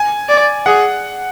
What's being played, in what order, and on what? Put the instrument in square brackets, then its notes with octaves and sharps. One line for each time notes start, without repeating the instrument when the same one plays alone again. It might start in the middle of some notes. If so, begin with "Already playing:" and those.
Already playing: [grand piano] G#5
[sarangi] D5
[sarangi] G#4 [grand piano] F#5